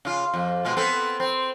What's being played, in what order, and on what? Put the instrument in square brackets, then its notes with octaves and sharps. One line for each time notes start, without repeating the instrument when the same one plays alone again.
[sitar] C#3 F4
F2
B2 G#3 F4
B3 C4 A4
C4